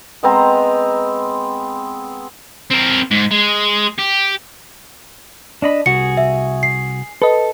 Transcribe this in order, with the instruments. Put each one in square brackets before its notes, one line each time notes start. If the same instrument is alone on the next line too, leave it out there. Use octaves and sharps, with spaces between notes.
[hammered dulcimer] G#3 B3 C4 A#5
[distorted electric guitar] C4 A#4
G#2
G#3
G4
[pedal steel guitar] D4 D#5 B5
[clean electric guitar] C2 F#4 [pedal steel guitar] G#4 [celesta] C#7
[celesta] E5
C7
[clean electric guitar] A4 [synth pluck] B4 D#5